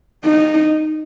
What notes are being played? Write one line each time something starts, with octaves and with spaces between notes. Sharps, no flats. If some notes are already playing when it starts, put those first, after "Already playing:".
D#4